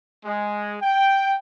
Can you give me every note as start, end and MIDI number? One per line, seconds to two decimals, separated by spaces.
0.24 0.76 56
0.82 1.36 79